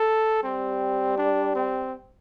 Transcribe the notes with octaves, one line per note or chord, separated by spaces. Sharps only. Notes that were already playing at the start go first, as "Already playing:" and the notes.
Already playing: A4
G3 C4
D4
C4